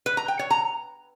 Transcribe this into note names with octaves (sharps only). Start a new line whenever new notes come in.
B4
A#5
G5
C#5
A#5